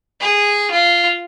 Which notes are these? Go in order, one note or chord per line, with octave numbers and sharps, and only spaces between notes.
G#4
F4